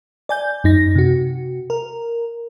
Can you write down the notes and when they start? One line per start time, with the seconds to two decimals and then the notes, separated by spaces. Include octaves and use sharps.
0.29 D5 G#5 G6
0.64 F#2 D#4 A#6
0.95 C3 F#4
1.70 A#4